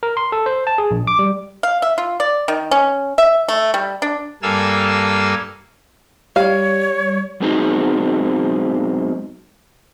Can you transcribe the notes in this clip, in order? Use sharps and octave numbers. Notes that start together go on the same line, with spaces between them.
A#4
C6
A4
C5
A5
G#4
A#1
D6
G3
F5
E5
F4
D5
D#3
C#4
E5
A3
G3
D4
G2 A#3 A4 F5 G#5 E6
G3 C#5 F5
F#2 B2 G#3 C4 D#4 F#4